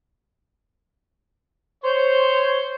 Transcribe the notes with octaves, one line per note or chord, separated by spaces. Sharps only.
C5 C#5